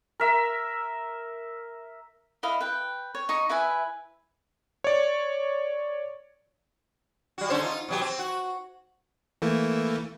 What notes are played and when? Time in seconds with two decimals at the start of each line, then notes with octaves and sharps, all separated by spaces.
0.20 A#4 E5
2.43 E4 D#5 F5 B5
2.60 B4 G5
3.15 C#5
3.29 D#4 C#6
3.49 E4 B4 E5 G#5
4.84 C#5 D5
7.38 G3 F#4
7.50 D3 C#4 C5
7.61 D#4 F4
7.89 B2 F#3 G4
8.01 C4
8.19 F#4
9.42 E3 A3 A#3